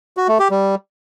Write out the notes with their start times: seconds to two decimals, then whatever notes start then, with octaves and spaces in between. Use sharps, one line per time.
0.17 F#4
0.28 A3
0.39 G4
0.50 G3